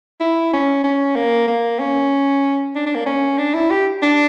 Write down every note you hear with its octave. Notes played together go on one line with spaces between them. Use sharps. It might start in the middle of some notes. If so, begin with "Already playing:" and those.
E4
C#4
C#4
A#3
A#3
C#4
D4
D4
A#3
C#4
D4
E4
G4
D4